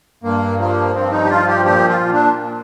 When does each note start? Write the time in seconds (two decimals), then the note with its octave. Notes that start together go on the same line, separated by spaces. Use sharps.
0.23 G2 A#3
0.59 F3 A#3
0.95 G2 C4
1.12 D#4
1.25 G4
1.30 F3 F4
1.48 G4
1.65 A#2 G4
1.89 F4
2.01 A#2
2.13 D4
2.37 A#2